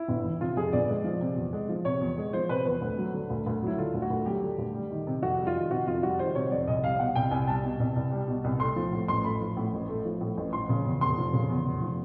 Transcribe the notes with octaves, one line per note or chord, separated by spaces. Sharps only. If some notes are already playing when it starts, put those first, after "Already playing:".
Already playing: E4
G1
E3
C3 F4
F2 G#4
G1 D5
G#3
F3
C3
E2
G#3
F3
C3 C#5
E2
G#3
F3 C5
C3 B4
E2 B4
D2
F#3
D3
D2
D2
F#3 E4
D3 F4
D2
F#4
D2
F#3 G4
D3
D2
G3
D#3
C3
F2 F#4
G3
F4
D#3
C3 F#4
F2 F4
G3 F#4
D#3 C5
C3 C#5
F2 D5
C2 D#5
G3 F5
B2 F#5
C2 G5
C2 G#5
G3 A5
B2
C2
C2
G3
B2
C2
A3 C6
F3
A2
A1 C6
A3 B5
F3
A2
A1
A3
F3
A2
A1
F3 C6
C#3
E2
F1 C6
F3
C#3
E2
F1
F3